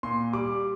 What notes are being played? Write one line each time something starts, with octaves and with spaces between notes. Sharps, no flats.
A#2 C6
G3 D6